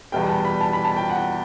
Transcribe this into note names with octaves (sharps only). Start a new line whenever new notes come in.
E2 B2 G3 B3 G5
A5
B5
A5
B5
A5
G5
F#5